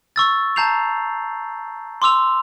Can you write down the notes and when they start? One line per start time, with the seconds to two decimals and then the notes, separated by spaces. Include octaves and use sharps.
0.16 C#6 E6 A6
0.56 A5 A#5 G6 C7 F7
2.02 C6 D6 E6 F7